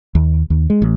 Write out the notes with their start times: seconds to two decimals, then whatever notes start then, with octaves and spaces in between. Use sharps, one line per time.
0.15 D#2
0.50 D#2
0.70 G#3
0.82 A1